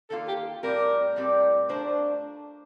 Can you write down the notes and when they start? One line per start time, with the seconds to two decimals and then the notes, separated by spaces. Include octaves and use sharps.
0.10 D#3 A#3 F4 A4
0.28 G4
0.63 A2 G3 C4 G4 A#4 D5
1.16 A2 G3 C4 G4 D5
1.69 A3 D4 F4 A#4 C5